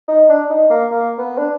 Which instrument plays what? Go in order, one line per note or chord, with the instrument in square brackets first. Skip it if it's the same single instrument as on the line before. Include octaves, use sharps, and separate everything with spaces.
[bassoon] D#4
D4
D#4
A#3
A#3
B3
D4